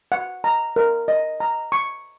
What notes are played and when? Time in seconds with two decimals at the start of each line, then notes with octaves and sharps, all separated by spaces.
0.12 F#5
0.44 A#5
0.76 A#4
1.08 D#5
1.40 A#5
1.72 C#6